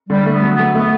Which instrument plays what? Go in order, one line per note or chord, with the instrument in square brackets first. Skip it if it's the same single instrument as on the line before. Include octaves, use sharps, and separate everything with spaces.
[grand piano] D3 [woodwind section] G3
[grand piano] A3
[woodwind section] B3
[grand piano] F#3
[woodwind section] B3
[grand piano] A3
[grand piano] A3 [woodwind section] B3